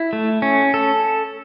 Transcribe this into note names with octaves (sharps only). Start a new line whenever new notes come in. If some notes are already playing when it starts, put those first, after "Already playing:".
Already playing: E4
A3
C#4
A4